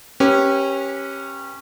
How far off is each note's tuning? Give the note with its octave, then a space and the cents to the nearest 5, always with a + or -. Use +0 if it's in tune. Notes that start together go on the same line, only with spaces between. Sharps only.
C#4 -20 G4 +0 B4 -35